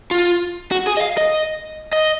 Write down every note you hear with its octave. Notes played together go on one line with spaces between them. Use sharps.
F4
F#4
G#4
D#5
F5
D#5
D#5